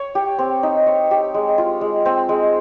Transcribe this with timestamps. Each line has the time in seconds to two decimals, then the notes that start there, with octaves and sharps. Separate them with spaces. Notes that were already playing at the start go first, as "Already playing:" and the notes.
Already playing: C#5
0.15 G4
0.39 C4
0.63 D#4
0.87 C#5
1.11 G4
1.34 G#3
1.58 F4
1.81 G#3
2.05 C4
2.29 G#3